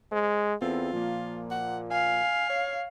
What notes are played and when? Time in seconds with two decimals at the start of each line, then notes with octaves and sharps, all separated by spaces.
0.12 G#3 C5
0.62 E2 B3 C4 F4 A4
0.93 A#2 F3 A#3
1.51 F#5
1.92 F5 G#5
2.50 C#5